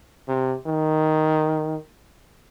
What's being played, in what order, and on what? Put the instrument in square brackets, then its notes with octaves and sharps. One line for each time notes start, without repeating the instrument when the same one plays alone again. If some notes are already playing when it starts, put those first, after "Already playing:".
[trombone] C3
D#3